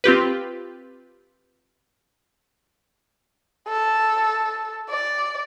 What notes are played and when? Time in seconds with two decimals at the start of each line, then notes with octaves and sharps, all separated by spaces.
0.04 C4 F4 G4 B4
3.68 A4
4.90 D5